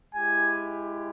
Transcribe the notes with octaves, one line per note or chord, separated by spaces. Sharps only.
G#3 E4 G4 G#5